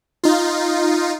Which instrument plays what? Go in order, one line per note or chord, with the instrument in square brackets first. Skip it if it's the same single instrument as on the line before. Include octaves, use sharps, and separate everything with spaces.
[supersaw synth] D#4 F4